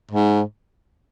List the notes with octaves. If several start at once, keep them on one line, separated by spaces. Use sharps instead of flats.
G#2